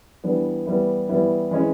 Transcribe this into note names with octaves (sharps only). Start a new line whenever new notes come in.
E3 G3 B3 D4
E3 G3 B3 E4
E3 G3 B3 E4
E3 G#3 C#4